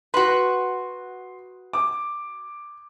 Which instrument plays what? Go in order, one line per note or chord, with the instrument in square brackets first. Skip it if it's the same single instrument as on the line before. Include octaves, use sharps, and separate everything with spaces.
[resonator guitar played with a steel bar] F#4 B4 [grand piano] C6
[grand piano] D6